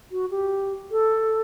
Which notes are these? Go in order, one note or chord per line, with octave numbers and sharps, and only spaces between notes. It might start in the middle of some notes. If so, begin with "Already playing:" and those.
F#4
G4
A4